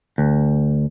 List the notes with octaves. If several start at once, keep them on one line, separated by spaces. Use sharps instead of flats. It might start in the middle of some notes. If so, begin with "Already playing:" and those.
D2